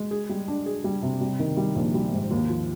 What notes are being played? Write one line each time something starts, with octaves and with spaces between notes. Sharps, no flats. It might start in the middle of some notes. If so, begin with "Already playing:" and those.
Already playing: G#3
G#4
G3
D4
G#4
G3
C3
G3
D#3
G3
A#1
G3
G#2
D#2
F3